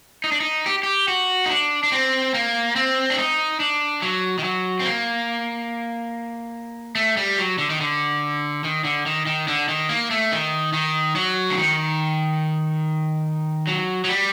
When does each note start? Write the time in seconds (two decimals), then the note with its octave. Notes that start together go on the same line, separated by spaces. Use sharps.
0.24 D#4
0.32 D4
0.40 D#4
0.66 G4
0.83 G4
1.08 F#4
1.46 D#4
1.50 D4
1.83 D4
1.92 C4
2.34 A#3
2.76 C4
3.10 D4
3.18 D#4
3.60 D4
4.02 F#3
4.38 D#3
4.44 F#3
4.79 C4
4.86 A#3
6.95 A3
7.17 G3
7.38 F#3
7.58 D3
7.70 D#3
7.81 D3
8.64 D#3
8.84 D3
9.06 D#3
9.26 D#3
9.48 D3
9.68 D#3
9.89 A#3
10.11 A3
10.32 D#3
10.73 D#3
11.15 F#3
11.50 D3
11.57 D#3
13.67 F#3
14.05 F#3
14.09 G3